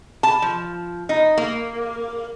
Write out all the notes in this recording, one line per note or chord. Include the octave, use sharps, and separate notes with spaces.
A5
F3
D#4
A#3